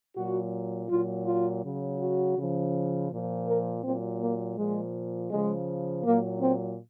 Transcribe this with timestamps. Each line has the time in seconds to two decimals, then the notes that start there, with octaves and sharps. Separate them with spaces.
0.15 A#2 F#3 F#4
0.89 A#2 F#3 F4
1.26 F4
1.62 C#3 F#3
1.99 F#4
2.36 C#3 F3
3.09 A#2 F3
3.46 A#4
3.83 A#2 F#3 C4
4.20 A#3
4.56 A#2 F3 G#3
5.30 C#3 F3 G#3
6.03 A#2 F#3 A#3
6.40 C4